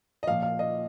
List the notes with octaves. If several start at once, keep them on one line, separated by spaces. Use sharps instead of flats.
D#5
A#2 F3 F5
F5
D#5